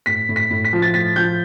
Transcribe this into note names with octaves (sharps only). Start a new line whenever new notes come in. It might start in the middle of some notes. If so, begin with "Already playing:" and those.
A2 B6
A2
B6
A2
B6
F3
A6
A2 B6
F3 G6